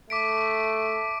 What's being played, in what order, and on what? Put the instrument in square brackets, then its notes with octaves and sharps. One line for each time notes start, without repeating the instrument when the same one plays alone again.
[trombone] A3 [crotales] D6 B6 D7